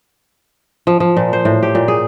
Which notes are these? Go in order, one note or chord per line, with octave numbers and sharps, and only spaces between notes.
F3
F3
A#2
C5
A2
G4
A#2
G#4